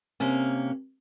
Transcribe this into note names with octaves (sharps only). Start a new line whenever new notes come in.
C3 A#3 C#4